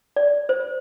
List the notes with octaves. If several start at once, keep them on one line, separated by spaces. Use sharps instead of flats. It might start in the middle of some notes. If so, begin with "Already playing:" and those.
D5
C5